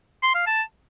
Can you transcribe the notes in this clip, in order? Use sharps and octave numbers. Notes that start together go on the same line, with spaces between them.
C6
F5
A5